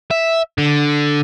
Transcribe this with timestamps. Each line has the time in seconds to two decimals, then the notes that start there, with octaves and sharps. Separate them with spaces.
0.11 E5
0.58 D3